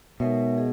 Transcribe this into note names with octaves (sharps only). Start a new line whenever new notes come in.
B2 G#3 D#4 A#4 C#5 E5
G#4 D#5